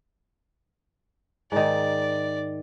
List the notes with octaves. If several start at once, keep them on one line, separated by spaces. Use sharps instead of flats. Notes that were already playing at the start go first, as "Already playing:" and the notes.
G#2 D#3 D5